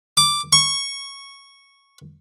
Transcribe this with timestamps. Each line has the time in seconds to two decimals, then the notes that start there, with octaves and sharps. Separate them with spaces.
0.17 D6
0.53 C#6